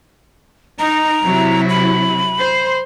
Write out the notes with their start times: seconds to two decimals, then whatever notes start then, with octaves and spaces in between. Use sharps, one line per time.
0.79 D#4 A#5
1.23 C3 F#3 E4
1.70 B5
2.39 C5